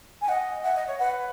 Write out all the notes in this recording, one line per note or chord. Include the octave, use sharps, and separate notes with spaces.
G#5
D#5 F#5
E5 F#5
D#5
C#5
B4 F#5